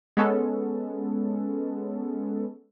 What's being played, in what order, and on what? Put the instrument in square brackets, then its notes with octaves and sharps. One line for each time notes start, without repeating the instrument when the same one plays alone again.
[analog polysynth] G#3 B3 C#4 A4